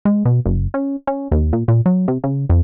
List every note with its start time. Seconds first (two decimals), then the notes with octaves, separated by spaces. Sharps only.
0.05 G#3
0.25 B2
0.45 F#1
0.74 C#4
1.07 C#4
1.31 D#2
1.53 A#2
1.68 A#2
1.86 F#3
2.08 C3
2.24 C#3
2.49 F2